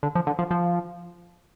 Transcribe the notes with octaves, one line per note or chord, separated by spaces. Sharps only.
D3
F3
D3
F3
F3